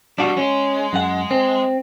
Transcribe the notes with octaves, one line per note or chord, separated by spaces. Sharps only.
B2 G3 D4 F#4
G#3 C#4
F#2 F#5
C4